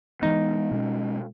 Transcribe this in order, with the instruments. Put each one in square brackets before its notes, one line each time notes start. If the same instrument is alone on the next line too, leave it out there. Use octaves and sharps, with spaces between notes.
[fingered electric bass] E3 G#3 B3 [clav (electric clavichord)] D#4
[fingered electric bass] B2 G#3 C#4